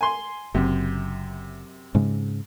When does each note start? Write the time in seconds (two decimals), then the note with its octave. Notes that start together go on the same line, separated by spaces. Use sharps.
0.01 G#5 C6
0.55 F#1 F#2 C3
1.95 G#2 C#3 G#3